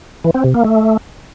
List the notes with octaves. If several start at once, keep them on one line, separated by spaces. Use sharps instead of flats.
E3
C4
C3
A#3
A3